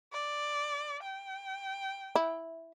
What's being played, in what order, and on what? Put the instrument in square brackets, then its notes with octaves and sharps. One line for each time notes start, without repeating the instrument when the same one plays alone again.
[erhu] D5
G5
[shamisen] E4